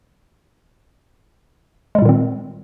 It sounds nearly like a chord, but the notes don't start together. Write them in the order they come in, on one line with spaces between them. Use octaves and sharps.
G#3 G3 A#2 D#3 C4